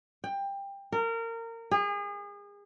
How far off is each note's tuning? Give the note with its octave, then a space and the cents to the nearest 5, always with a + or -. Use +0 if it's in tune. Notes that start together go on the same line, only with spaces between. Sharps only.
G5 +20
A#4 -25
G#4 -35